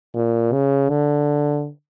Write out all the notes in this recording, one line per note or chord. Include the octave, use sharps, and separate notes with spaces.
A#2
C#3
D3